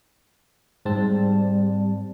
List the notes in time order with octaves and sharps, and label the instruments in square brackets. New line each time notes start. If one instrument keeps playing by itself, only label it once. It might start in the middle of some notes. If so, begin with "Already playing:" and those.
[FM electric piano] G#2 C4 A5 [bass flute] G3